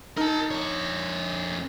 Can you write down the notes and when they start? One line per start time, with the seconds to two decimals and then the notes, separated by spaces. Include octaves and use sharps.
0.17 D#4 A#4 A5
0.51 F2 C#5